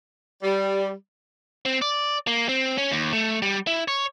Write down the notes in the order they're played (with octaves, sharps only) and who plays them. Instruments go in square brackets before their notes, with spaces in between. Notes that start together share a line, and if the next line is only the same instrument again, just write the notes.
[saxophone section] G3
[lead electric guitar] C4
D5
A#3
C4
C#4
D#2
A3
G3
E4
C#5